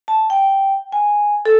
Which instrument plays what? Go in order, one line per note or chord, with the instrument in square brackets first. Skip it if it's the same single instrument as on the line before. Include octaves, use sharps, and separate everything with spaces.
[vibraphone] A5
G5
G#5
A4